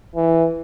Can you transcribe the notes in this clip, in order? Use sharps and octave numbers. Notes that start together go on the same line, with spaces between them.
E3